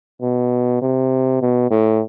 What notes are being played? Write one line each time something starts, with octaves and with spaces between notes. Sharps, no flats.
B2
C3
B2
A2